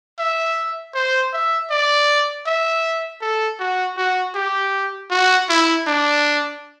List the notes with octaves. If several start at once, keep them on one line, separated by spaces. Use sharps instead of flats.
E5
C5
E5
D5
E5
A4
F#4
F#4
G4
F#4
E4
D4